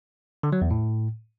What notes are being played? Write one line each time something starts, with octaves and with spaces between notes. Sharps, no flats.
D3
F#3
E2
A2